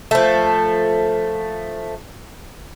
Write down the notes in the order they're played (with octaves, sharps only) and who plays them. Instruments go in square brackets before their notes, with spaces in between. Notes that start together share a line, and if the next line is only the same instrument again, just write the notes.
[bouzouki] F3 A3